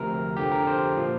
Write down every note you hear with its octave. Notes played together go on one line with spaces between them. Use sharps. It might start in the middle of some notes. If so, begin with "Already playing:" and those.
Already playing: D2 C3 F3 A#4
F2 D3 F3 G4
A#4
C5
A#2 F3